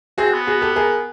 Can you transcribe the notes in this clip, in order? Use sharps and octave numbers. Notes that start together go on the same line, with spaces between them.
C4 F#4 G#4
B3
F#4 G#4
G4 A4
G#4 A#4